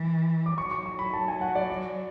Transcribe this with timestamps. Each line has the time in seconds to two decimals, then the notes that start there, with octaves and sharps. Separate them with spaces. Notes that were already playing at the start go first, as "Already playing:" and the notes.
Already playing: E3
0.46 D6
0.58 F#3 C#6
0.71 C#6
0.86 C#6
0.99 B5
1.13 A5
1.28 G#5
1.41 F#5
1.55 D5
1.70 D5